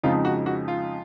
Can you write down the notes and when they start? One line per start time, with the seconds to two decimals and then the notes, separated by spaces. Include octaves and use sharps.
0.03 F2 C#3 F3 G#3 D#4 F4
0.25 F#4
0.46 F#4
0.68 F4